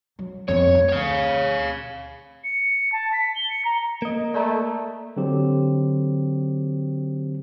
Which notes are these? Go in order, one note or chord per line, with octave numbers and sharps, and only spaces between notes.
F#3
F2 B3 C#5
D2
C#5 F5
C#7
A5
B6
G7
C#7
A#5
A#3 D#5
A3 D5 A#5
D3 F#3 C4 G4